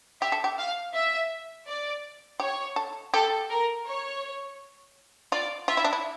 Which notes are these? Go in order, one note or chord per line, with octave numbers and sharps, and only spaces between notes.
G4 E5
A4
G4
F5
E5
D5
G4 C#5
A4
G4 A4
A#4
C#5
F4 D5
F4 E5
E4
D4
E4